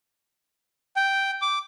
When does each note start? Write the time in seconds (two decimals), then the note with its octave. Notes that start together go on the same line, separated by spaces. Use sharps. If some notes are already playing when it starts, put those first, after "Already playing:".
0.96 G5
1.42 D6